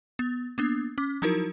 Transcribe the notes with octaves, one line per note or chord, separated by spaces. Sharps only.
B3
A#3 B3 D4
C#4 D6
F3 F#3 D#4 E4 F#4 A#4